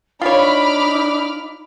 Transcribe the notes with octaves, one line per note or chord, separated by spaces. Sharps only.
D4 D#4 F4 C#5 B5 D6 F6